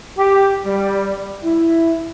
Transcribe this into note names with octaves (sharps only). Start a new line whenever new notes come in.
G4
G3
E4